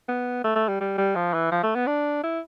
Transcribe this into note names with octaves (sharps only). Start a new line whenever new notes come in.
B3
A3
A3
G3
G3
G3
F3
E3
F3
A3
B3
D4
E4